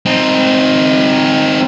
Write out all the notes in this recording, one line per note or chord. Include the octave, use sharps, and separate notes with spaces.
C4 D#4